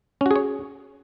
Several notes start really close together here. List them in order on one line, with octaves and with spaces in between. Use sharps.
C#4 F#4 G#4 C#5